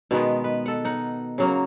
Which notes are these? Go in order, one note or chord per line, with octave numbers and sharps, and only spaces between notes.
B2 D#3 G#3 B3
B4
A4 F#5
D#4 F#5
C#3 F#3 A#3